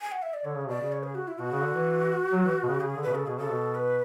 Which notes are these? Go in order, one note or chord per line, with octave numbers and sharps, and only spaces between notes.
G#5
F#5
E5
D5
D3 C#5
C#3
B2 D5
C#3
C#5
G#4
F#4
E4
B2 F#4
C#3
D3
E3
F#3
E3
B2
C#3
C#3 G#4
D3
B2 B4
C#3 A4
B2 G#4
C#3 A4
B2
B4